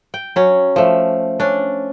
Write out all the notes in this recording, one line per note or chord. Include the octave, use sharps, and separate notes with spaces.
G5
F#3 C#4
F3 A3
C#4 D4